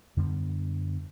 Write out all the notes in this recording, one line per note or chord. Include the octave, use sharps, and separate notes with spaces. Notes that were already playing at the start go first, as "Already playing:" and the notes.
F#2 D3 G3 B3